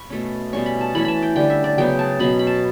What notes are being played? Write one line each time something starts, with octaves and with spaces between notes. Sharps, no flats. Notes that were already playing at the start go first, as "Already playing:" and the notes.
Already playing: B5 C#6
B2 A3 C#4
B2 G3 C#4 C#6
B5
A5
E3 A3 C#4 B5
A5 B5
G5
D3 G3 C#4 G5
E5
D5
C#3 F#3 B3 G5
A5
B2 F#3 C#4 B5
B5
A5